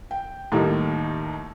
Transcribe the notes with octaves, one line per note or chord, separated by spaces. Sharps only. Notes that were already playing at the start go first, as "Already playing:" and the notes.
G5
D#2 A2 D#3 G3 A#3